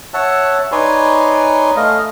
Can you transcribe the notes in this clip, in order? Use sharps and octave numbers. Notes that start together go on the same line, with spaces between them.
C#5 E5 F#5 A5
D#4 B4 C#5 D5 G#5 C6
A3 D#5 F5